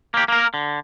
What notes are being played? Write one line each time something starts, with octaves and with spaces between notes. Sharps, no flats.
A#3 G4
A#3 A#4
D3